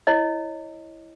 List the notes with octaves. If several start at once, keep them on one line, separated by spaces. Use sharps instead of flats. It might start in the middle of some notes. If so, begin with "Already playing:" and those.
E4 C#5 D#5